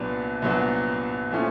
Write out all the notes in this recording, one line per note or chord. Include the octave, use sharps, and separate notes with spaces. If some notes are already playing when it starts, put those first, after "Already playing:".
Already playing: C2 A#2 F#3 B3 D4
C2 A#2 F#3 B3 D4
A#2 F3 A3 C#4